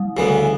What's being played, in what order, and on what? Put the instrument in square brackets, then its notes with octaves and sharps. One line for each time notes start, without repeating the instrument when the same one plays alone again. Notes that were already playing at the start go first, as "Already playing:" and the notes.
Already playing: [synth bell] G3
[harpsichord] D2 C#3 E3 B3